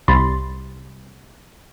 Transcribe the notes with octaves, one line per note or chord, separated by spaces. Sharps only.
C2 B5 C6 A6